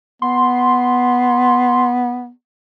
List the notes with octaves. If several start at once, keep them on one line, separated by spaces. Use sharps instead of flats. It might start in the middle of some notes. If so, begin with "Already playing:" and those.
B3 C6